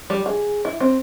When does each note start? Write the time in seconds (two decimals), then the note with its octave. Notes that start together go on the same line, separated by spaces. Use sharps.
0.10 G3
0.26 G#4
0.65 E4
0.80 C4